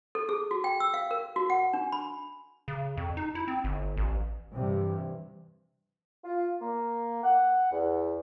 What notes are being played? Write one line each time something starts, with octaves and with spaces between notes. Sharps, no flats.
A4
G#4
F#4
G5
E6
F5
A#4
F#4
F#5
D4
B5
C#3
F2
D#4
E4
C4
G1
A1
G2 C3 E3
F4
A#3
F#5
E2